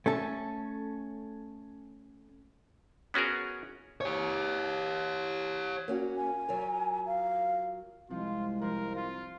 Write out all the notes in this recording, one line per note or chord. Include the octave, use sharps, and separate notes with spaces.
A3 C#4 A4
B3 C#4 F#4 G#4 A#4
G4 C#5
A#3 C#4 F#4
G#5
F#3 F4 A#4
F5
C2 F3 G#3 F4
F3 A#4 C6
F4